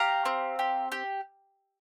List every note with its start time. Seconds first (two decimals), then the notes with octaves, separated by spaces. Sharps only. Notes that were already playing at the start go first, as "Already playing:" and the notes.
Already playing: G4 F5 A#5
0.25 C4
0.59 G4
0.92 G4